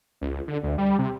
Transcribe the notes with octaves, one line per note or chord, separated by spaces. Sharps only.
C#2
D3
D2
G3
C3